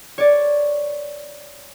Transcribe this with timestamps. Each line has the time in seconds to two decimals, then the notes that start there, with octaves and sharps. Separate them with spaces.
0.18 C#5 D5